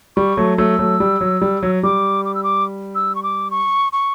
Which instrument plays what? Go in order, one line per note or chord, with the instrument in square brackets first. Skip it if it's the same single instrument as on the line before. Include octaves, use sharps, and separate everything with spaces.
[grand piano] G3 [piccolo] C#6
[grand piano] F#3 A3
[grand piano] F#3 A3 [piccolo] E6
[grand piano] F#3 A3
G3
F#3
G3
F#3
[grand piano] G3 [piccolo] D6
[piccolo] D6
E6
D6
E6
C#6
D6
C#6
C#6